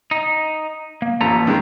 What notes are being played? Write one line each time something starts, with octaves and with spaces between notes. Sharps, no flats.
D#4
A#3
A1 A#2 A4 B4 A#5
D#3 G#3